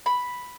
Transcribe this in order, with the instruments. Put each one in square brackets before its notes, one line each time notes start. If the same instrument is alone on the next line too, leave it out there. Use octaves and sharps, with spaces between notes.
[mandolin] B5